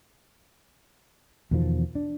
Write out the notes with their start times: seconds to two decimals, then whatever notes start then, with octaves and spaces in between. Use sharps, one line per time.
1.51 E2 B2 D#3 F3
1.95 D4